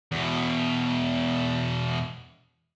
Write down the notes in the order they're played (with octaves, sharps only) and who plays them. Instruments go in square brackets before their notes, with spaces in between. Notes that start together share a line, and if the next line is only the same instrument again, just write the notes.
[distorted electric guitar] E2 B2